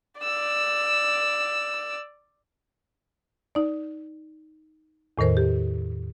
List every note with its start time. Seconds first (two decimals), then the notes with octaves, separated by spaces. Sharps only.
0.21 D5 E6
3.55 D#4 D5
5.18 E2 A2 D#3 A#4 C5
5.37 G4